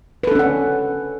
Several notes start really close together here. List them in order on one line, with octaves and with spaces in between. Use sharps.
B4 A4 D4 C#4 F#5